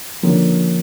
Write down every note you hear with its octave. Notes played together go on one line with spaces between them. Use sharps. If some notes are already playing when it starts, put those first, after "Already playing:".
D3 F3 A#3 C#4